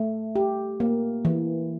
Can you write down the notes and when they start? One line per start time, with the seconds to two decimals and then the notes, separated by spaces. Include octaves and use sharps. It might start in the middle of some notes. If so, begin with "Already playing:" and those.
Already playing: A3
0.36 G4
0.80 A#3
1.25 E3